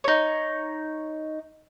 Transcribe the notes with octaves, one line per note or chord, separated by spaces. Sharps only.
D#4 C#5